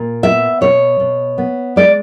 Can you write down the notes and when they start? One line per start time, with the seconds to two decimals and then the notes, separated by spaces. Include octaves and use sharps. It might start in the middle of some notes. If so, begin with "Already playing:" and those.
Already playing: A#2
0.23 B3 E5
0.61 B2 C#5
1.00 B2
1.38 B3
1.76 G#3 D5